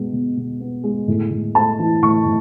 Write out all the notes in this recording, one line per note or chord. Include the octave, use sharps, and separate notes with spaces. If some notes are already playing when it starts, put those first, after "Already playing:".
Already playing: B2 G#3 B3
B2
B2
B3
G#3
A2
A2
A3 A5
E3
A2 C#6
A2